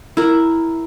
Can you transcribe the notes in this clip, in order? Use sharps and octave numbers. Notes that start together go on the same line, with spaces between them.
E4 A#4